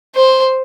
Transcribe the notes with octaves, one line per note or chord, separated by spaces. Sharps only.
C5